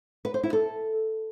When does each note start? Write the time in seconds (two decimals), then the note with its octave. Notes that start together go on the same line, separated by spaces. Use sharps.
0.25 B4
0.34 C5
0.43 E4
0.53 A4